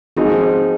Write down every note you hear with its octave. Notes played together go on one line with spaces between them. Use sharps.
G#2 F3 C4 D#4 F#4 G#4